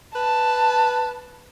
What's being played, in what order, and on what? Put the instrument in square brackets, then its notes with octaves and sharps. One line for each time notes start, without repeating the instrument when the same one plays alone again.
[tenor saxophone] B4 [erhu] A5